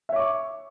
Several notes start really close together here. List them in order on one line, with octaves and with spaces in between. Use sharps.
E5 C#5 D6 C#6